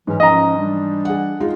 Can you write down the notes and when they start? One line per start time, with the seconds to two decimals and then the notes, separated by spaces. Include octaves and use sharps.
0.07 G#2 E3 F#3 C#4
0.20 F3 C#4 D#5 A#5
0.56 E3 G3 D4
1.05 G#4 F#5
1.40 G#3 D#4 F4